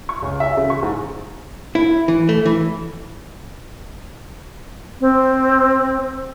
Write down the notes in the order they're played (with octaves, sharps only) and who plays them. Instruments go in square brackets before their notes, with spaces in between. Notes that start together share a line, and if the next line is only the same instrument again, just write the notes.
[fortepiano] C#6
C#2
E5
C#3
C#6
G#2
[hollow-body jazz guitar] E4
E3
A3
E3
[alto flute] C4